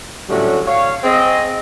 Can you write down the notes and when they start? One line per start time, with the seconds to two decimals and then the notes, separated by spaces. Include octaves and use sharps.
0.29 A2 D3 F#3 G3 C#4 F#4
0.66 C#5 F5
1.04 C4 G#4 D#5